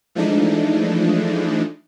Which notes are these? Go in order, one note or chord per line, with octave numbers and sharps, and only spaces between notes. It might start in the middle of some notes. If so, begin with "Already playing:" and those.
E3 F3 G#3 A3 D4 D#4